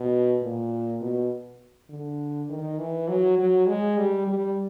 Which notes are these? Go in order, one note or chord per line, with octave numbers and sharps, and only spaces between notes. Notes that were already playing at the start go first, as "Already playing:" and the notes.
Already playing: B2
A#2
B2
D3
D#3
E3
F#3
F#3
G#3
G3
G3